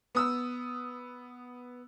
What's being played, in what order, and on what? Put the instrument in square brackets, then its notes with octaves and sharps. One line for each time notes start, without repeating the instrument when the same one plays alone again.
[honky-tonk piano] B3 D#6 E6